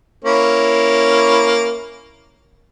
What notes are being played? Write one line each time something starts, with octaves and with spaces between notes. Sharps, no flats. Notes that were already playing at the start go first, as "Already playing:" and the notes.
A#3 C#4 E4